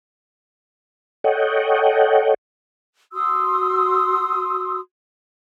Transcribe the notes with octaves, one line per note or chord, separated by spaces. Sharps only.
A4 C#5 D#5 F#5 G5
F#4 C6 D#6 E6